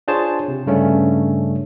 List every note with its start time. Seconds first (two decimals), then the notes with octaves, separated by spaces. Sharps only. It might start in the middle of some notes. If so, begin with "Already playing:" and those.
0.08 D4 F4 G#4 C5 C#5 A5
0.48 C3
0.66 G2 C#3 A3 C#4 D4